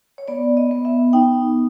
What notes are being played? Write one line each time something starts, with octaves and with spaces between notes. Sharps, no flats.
C#5
B3 D5
D#5
B3
E5
D#4 G5